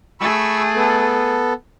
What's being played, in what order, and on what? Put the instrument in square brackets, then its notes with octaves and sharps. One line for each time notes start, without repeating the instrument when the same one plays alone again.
[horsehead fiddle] A3 G#4 [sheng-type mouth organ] B5 C#6 E6
[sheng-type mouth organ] B3 A4